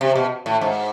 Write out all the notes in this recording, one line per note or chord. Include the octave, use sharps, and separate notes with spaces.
C3
B2
A2
G#2